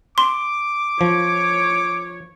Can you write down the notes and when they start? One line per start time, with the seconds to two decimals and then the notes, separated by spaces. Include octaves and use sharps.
0.18 C6 D6
1.01 F3 C#5